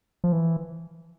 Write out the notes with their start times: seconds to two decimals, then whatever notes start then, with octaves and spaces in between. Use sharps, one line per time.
0.24 F3
0.32 E3